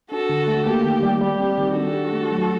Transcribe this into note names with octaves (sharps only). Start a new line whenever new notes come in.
D4 F#4 A4
D3
A3
A#3 G4
D#3
G3
G3 G4
C4
D#3
D4 F#4 A4
G4
A3
F#3